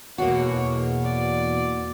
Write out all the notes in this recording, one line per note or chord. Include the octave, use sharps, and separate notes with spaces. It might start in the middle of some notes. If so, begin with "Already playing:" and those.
E2 B2 A#3 F#4 C#5
D5